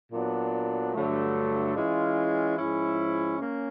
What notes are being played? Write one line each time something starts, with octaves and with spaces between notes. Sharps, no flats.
A#2 F#3 B3 D4
G2 D3 F#3 A3
E3 G#3 C#4 F4
G#2 F3 G#3 C#4 E4
A#3 C#4